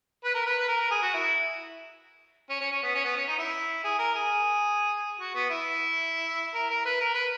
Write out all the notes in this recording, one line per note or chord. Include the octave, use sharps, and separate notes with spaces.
B4
A#4
B4
B4
A#4
A#4
G#4
F#4
E4
C#4
C#4
C#4
B3
C#4
B3
C#4
D#4
E4
G#4
A#4
G#4
F#4
B3
E4
A#4
A#4
B4
A#4
B4